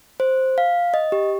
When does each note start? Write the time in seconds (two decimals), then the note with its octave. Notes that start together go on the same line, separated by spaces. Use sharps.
0.20 C5
0.58 F5
0.94 D#5
1.12 G4